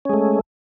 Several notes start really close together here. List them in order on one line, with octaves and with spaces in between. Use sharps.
C#4 G#3 A3